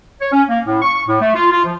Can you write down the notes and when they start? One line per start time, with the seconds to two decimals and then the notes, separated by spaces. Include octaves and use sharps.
0.21 C#5
0.33 C#4
0.49 A#3
0.66 A2
0.82 C#6
1.09 A2
1.21 A3
1.36 F4
1.51 F4
1.65 F3